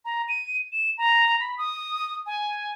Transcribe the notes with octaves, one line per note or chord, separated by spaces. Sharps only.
A#5
D#7
E7
A#5
B5
D#6
G#5